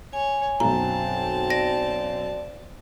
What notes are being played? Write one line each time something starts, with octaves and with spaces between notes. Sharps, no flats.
C#5 G#5
B1 F#2 C4 A5 A#5
D5 A#6